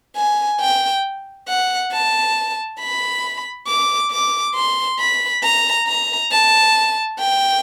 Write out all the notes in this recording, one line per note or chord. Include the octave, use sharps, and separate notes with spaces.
G#5
G5
F#5
A5
B5
D6
D6
C6
B5
A#5
A#5
A5
G5